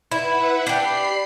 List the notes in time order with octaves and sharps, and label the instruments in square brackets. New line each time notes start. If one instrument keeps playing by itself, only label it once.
[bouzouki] E4 [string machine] B4 E5 F#5
[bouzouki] D4 G4 [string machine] B5 C7